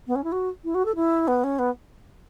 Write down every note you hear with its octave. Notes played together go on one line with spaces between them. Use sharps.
B3
C#4
E4
F#4
E4
F#4
A4
E4
B3
C#4
B3